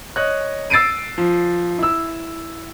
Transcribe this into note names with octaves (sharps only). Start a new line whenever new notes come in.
C#5 D#5 F#6
E6 A6 C7 D7 D#7
F3
E4 E6